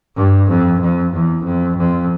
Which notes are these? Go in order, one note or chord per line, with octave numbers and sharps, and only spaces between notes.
G2
F2
F2
E2
F2
F2